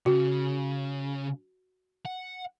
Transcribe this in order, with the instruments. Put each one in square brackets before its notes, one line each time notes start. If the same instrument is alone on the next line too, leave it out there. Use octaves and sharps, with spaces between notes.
[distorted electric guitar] C#3 [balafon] F#4
[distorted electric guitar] F#5